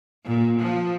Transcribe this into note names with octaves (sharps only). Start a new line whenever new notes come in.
A#2
F3